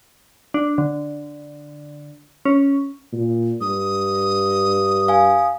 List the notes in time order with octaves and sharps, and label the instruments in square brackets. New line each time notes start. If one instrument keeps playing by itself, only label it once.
[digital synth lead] D4
D3
C#4
[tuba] A#2
[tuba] G2 [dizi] D#6
[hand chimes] F5 G#5